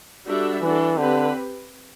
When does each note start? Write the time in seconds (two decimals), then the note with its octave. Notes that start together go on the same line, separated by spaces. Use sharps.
0.26 G3 D4 F#4 A4 E5
0.62 E3 D4 F#4 A4
0.97 D3 C4 G4 B4